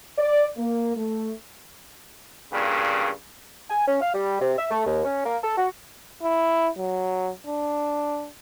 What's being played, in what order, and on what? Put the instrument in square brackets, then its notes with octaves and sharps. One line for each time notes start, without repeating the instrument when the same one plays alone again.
[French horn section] D5
A#3
A3
[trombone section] G2 A#2 C#3
[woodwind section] G#5
C#4
F5
G3
C3
E5
A3
D#2
C#4
A#3
A4
F#4
[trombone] E4
F#3
D4